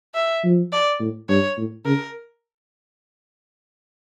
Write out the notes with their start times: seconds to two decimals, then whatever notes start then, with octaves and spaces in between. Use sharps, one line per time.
0.15 E5
0.44 F3
0.72 D5
1.00 A2
1.29 G2 C#5
1.58 A2
1.86 C#3 A#4